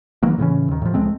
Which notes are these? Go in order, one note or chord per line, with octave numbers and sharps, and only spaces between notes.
D#3 E3 F#3 A#3
A2 C#3 E3 C#4
D#2 D#3
A2 F3
C#2 G#3 A3 C4